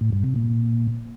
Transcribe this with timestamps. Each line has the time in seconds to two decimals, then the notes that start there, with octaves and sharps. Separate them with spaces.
0.01 A2
0.12 G2
0.24 C3
0.36 A#2